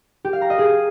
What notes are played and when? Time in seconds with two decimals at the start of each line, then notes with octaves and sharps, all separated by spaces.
0.25 G4
0.33 F5
0.42 A#5
0.50 D#5
0.59 G#4